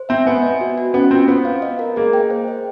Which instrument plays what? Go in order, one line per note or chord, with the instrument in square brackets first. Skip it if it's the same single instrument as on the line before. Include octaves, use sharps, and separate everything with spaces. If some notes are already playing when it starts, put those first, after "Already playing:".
Already playing: [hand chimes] C5
[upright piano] C4 [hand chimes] E5
[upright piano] B3 [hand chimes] G#5
[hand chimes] D#5
F#4
F#4
[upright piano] B3 [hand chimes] C#4
[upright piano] C4 [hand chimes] F4
[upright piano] B3 [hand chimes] C5
[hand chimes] F5
D#5
A#4
[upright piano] A#3 [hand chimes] G#4
[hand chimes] G5
C5
D#5